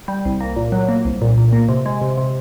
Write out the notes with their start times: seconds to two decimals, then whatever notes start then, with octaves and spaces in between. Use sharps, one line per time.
0.08 G3
0.25 C2
0.41 A#3
0.56 A#2
0.72 F#3
0.89 A#3
1.05 C2
1.22 A#2
1.38 A#2
1.53 A#3
1.69 C3
1.86 G#3
2.02 C3
2.18 C3